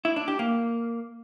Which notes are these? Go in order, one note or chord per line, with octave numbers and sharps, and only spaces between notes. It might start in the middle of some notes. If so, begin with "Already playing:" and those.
E4
D4
G4
A#3